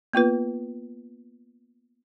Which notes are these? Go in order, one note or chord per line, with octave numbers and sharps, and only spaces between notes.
A#3 B3 F4 B4